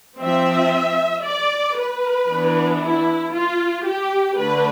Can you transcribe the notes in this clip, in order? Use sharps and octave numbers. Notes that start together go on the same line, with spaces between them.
F3 C4 E5
D5
B4
E3 B3 D4
E4
F4
G4
D3 A3 D4 B4